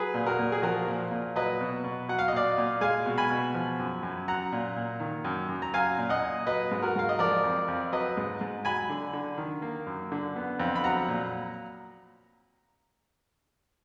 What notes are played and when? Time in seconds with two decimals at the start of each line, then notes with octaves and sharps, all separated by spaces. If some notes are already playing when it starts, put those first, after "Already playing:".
Already playing: F#3 G#4 B4
0.14 A#2
0.26 F#4 A#4
0.39 A#2
0.52 G#4
0.62 F3 F#4 A#4
0.87 A#2
1.11 A#2
1.36 F#3 B4 D#5
1.61 B2
1.84 B2
2.09 F#3 F#5
2.19 F5
2.28 D#5
2.33 A#2 D5 F5
2.58 A#2
2.81 G#3 F5 G#5
3.06 B2
3.18 G#5 B5
3.30 B2
3.54 F3
3.79 F#2
4.03 F#2
4.28 F#3 F#5 A#5
4.52 A#2
4.76 A#2
5.00 D#3
5.25 F#2
5.49 F#2
5.62 A#5
5.74 F#3 F5 G#5
5.98 A#2
6.09 D#5 F#5
6.22 A#2
6.47 F#3 B4 D#5
6.71 G#2
6.82 F#4 A#4
6.96 G#2 F5
7.09 D#5
7.19 F3 A#4 D5
7.44 F2
7.68 F2
7.92 F#3 B4 D#5
8.17 G#2
8.41 G#2
8.65 F#3 G#5 B5
8.90 D3
9.13 D3
9.38 D#3
9.62 A#3
9.87 F#2
10.12 D3
10.36 B3
10.60 F2
10.76 B5
10.84 F#3 F#5 A#5
11.08 A#2